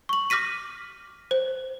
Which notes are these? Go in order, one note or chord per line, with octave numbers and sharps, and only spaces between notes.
C#6 F#7
D6 F6 A#6 B6 D#7
C5